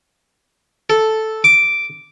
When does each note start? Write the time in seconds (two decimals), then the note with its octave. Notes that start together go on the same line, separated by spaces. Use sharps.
0.90 A4
1.44 D6